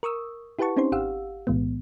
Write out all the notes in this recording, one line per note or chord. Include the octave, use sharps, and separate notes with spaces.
A#4 C#6 D#6 E6
E4 G4 B4 F#5 A5 C#6
C4 C#4 D#4 G4 C5 C6
G#1 G4 F5 F#5 E6
B1 A2 E3 G#3 B3